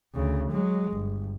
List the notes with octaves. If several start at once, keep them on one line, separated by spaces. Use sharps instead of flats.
D2 C#3
F#3 G#3
G1